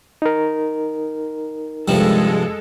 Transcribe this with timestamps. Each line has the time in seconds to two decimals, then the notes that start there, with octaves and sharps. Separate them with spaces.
0.22 D#4 A#4
1.88 G2 C3 F3 G#3 A4